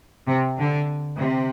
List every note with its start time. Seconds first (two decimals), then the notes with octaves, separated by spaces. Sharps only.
0.27 C3
0.58 D3
1.18 C3